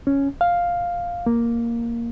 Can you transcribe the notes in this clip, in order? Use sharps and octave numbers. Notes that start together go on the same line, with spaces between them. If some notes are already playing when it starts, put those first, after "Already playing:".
C#4
F5
A#3